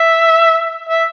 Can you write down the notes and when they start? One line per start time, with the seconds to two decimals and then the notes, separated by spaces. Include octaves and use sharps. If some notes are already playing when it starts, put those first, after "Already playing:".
Already playing: E5
0.89 E5